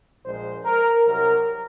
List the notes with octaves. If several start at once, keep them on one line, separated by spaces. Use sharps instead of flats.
A#1 A#2 G#3 C5
A#4
C2 C3 F#3 A#4